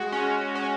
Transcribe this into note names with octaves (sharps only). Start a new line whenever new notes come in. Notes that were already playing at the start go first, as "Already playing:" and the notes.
Already playing: G#3 F#4
C#4
C#4